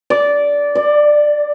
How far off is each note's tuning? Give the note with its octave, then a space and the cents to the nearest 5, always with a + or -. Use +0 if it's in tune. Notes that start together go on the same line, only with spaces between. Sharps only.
D5 -15
D5 +15